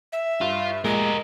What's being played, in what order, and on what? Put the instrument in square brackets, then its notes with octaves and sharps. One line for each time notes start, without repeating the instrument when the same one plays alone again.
[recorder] E5
[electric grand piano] G2 [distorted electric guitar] F4
[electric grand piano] A#2 G#3 [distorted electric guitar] G4 A#4 [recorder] D#5